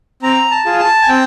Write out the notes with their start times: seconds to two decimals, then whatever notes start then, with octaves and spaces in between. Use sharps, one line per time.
0.22 C4 A#5
0.51 A5
0.66 F4 G#4
0.79 A5
1.02 G#5
1.08 C4 G5